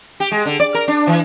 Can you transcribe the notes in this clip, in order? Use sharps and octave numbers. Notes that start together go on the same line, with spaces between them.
G4
G#3
D3
D5
A#4
D4
E3